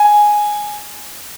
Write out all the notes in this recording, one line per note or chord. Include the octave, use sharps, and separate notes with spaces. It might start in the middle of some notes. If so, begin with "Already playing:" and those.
Already playing: G#5